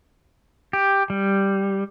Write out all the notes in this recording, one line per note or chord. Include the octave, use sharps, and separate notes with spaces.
G4
G3